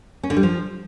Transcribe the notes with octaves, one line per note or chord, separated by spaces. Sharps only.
C#4
D3
G3
F3